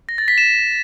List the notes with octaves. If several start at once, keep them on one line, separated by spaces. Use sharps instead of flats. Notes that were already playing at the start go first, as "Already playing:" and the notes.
A#6
A6
B6
E7